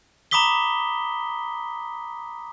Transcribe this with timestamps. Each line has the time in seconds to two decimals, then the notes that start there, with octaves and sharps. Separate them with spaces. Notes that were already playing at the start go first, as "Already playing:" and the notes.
0.31 A#5 B5 D6 D#6 B6 G7